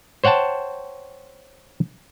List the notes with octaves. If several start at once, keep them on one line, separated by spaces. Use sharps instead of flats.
C5 C#5 F#5 G5 A5